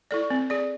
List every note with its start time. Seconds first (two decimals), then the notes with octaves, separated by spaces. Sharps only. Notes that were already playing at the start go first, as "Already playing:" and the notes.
0.11 E4 A4 D5
0.30 C4
0.50 G#4 D5